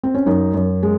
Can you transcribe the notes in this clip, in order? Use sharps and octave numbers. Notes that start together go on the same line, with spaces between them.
C4
C#4
F#2 D#4
F#2
G#3